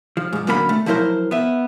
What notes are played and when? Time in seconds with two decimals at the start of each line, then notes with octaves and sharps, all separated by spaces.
0.17 F3
0.33 G#2 F3
0.47 F#2 A#2 D3 A#3 A#4 B5
0.69 A3
0.86 F3 F#3 E4 A#4 C5
1.31 B3 E5